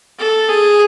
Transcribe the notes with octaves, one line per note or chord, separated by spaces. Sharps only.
A4
G#4